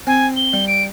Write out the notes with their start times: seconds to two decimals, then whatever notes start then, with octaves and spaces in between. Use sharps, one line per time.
0.07 C4 G#5
0.37 G7
0.53 G3
0.68 D7